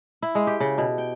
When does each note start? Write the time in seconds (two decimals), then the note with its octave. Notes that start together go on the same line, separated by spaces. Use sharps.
0.22 E4
0.35 G#3
0.47 G4
0.60 C#3
0.78 B2
0.98 G5